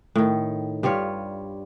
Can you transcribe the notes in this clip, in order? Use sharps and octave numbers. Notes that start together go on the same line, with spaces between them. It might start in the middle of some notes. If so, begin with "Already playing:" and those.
A2 D#3
G2 G3 F4 C#5